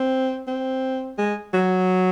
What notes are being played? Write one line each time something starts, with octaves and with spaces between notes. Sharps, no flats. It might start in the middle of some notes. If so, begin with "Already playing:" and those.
Already playing: C4
C4
G#3
F#3